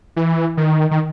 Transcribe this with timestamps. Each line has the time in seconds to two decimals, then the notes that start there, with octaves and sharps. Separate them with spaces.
0.16 E3
0.57 D#3
0.91 D#3